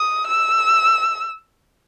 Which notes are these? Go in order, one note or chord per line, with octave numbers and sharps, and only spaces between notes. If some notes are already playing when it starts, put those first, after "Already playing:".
Already playing: D#6
E6